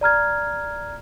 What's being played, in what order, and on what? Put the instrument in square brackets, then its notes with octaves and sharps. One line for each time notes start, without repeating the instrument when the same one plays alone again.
[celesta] D5 A#5 F6 G#6